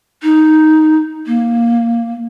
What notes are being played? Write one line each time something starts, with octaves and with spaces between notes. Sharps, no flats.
D#4
A#3